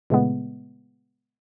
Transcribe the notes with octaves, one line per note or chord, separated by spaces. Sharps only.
A#2 C#3 E3 G#3 A3 B3